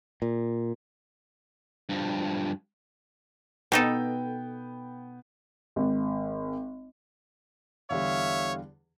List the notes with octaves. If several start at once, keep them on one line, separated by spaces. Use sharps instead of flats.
A#2
G2 F3
B2 B3 D#4 A4 G5
G#1
E2 D3 G3 C#5 E5 F5